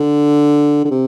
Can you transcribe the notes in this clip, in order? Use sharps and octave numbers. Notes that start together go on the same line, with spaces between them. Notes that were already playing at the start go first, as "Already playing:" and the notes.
Already playing: D3
D3
C3